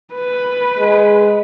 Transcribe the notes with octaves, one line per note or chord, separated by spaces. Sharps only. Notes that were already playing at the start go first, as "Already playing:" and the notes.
B4
G#3